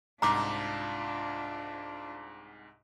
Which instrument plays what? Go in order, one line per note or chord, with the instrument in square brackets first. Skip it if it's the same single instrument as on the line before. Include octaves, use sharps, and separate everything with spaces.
[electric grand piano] C2 G#2 [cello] D4 F4 [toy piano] A#5 D6